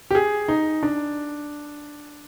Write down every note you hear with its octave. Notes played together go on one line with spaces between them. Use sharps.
G4
G#4
D#4
D4